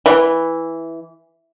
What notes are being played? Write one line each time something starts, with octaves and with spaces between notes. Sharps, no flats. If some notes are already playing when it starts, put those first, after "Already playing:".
E3